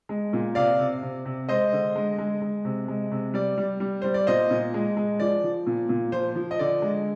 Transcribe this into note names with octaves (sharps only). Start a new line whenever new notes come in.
G#3
A#2
C3 D5 F5
C3
C3
C3
G#3 C5 D#5
D3
G#3
G#3
G#3
C3
G#3
C3
G3 D5
G3
G3
G3 C5
D5
A#2 C5 D#5
A#2
G#3
G#3
F3 D5
F3
A#2
A#2
F3 C5
F3
D#5
D3 D5
G#3